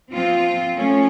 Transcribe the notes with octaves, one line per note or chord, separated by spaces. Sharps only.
F3 C4 F4
F3 A3 C#4